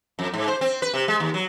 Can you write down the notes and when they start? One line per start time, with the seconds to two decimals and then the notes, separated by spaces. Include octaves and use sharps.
0.19 F2
0.34 G#2
0.48 C5
0.61 C4
0.82 B4
0.94 C3
1.08 G#3
1.20 D#2
1.34 F#3